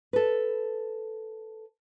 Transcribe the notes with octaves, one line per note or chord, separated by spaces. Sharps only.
A4 B4